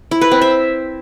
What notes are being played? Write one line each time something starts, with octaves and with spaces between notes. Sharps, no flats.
E4
B4
C4
E5